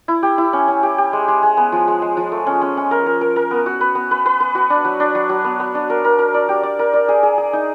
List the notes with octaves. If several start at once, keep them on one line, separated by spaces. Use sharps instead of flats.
E4
G4
E4
C#4
C#4
G4
G4
G#3
G#3
G#3
B3
F3
G#3
G#3
F3
A3
C#4
C#4
C#4
A#4
A#4
A#4
A#4
B3
F#4
B4
B3
B4
B4
B4
F#4
D4
F#3
D4
F#3
F#3
B3
B3
D4
A#4
A#4
A#4
D5
G4
D5
A#4
D5
G#4
G#4
G#4
D#4